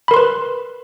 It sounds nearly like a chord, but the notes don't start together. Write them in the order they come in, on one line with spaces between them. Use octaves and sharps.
B5 A#4 C6 B4